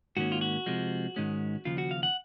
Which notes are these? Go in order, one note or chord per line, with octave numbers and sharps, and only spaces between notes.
G#2 D#3 A#3 C#4 F#4
F4
F#4
C3 F3 G#3
G#2 D#3 G#3 C#4
D#2 C#3 F3 F4
F#4
F5
F#5